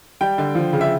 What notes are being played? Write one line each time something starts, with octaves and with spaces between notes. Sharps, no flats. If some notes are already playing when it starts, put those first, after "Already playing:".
G3 G5
D3
F3
C#3
E5